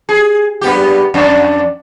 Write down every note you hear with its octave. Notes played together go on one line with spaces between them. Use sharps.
G#4
F#2 B3 G4
F2 D4